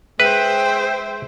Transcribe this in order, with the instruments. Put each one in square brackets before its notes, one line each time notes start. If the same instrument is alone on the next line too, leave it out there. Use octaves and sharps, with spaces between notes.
[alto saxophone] G#3 [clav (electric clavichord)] B4 [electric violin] C5 E5 [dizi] G5